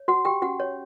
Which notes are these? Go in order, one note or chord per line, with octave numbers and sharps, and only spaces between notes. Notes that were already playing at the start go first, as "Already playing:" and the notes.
Already playing: C#5
F#4 F#5
G4 G5
C#4 F#4 F#5
C#5